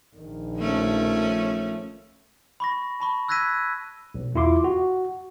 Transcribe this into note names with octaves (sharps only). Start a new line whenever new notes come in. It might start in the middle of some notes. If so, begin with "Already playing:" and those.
A#1 D#3
F3 A3 C#4
B5 C#6 A#6
A5 B5 C#6
E6 F#6 G#6 A#6 B6 D#7
B1
E2 E4 F4 C6 D6
F#4